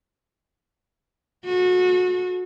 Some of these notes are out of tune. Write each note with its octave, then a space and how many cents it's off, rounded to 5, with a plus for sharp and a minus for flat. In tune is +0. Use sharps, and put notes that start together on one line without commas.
F#4 -30 A4 -30